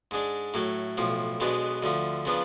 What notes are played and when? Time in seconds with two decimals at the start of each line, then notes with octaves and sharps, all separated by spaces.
0.11 G#2 G#3 D4
0.54 A2 F#3 A3
0.97 B1 A2 F3
1.40 B1 B2 G#3 B3 D4
1.83 D2 D3 F3
2.25 C#3 F3 B3 D4